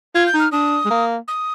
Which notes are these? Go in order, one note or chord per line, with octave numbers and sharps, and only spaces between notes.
F4 G#6
G6
D#4
F6
D4 D#6
G#3
A#3
D#6